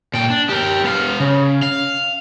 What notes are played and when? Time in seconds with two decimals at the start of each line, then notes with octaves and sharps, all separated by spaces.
0.14 A#2 G5
0.30 D4
0.49 G4 A#4
0.84 B3 F5
1.20 C#3
1.62 F5